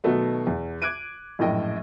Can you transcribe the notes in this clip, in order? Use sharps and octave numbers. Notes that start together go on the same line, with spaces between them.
B2 D#3 F#3 A3 B3
E2
D6 F#6 G#6 D7 D#7
A#1 F#2 A2 D#5 G5